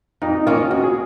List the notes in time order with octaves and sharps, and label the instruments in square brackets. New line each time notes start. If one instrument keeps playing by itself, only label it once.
[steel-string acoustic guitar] F2 [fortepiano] D#4
[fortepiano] D#4
[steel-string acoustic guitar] D#3 A#3 C#4 [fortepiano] F4
[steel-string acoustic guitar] D#2 [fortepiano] F#4
[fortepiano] G#4